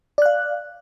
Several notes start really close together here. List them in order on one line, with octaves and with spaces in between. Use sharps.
D5 F#6 F5